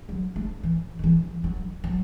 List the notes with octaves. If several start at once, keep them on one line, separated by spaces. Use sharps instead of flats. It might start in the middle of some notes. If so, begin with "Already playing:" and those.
F#3
A3
E3
D#3
E3
F#3
F#3